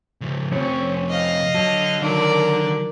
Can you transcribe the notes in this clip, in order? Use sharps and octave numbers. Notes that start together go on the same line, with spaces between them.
C#3 F3
F2 C3 F3 C4 C#4 C#5
D#5 F5
D3 F#3 A5
D#3 F#3 A#4 D5